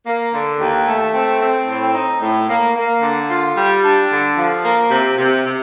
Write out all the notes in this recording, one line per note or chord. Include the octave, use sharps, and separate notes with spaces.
A#3
D3
D#2
A3
C4
C4
A2
D#4
A2
A#3
A#3
D3
F4
G3
D4
D3
F3
A#3
C3
C3
C3